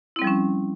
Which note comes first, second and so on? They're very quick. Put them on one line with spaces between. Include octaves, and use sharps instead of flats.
E4 C4 G3 F3 C#4